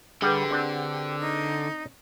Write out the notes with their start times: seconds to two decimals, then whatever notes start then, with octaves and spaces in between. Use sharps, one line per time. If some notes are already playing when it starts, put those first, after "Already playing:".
0.22 D3 G3 G4 G#4 B4 F#5
0.51 C4 D4 F#5
1.20 D#4